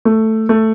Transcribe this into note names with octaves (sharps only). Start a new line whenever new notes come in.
A3
A3